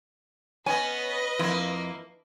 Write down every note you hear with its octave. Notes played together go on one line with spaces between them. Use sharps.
B3 C#4 B4 D#5 G#5
F2 A#3 E4